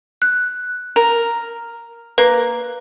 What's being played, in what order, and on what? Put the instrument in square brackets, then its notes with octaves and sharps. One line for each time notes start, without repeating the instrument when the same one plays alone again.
[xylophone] F#6
[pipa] A#4
[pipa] A#3 [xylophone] B4